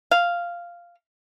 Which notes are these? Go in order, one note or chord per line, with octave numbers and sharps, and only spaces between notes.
F5